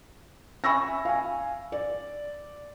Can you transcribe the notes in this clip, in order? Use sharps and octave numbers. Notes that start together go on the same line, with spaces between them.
E5 G#5 B5 C#6 E6 A#6
F5 G#5
D5